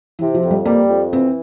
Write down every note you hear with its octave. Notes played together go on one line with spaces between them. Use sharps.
C3 E3
F3
F2
G3
G3 A#3
F2
E3 C4